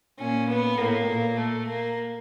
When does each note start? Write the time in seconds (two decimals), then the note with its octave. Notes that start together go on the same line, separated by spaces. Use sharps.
0.19 A#2 C#4
0.48 B3
0.78 A2 A#3
1.08 A#2
1.37 A3
1.67 A#3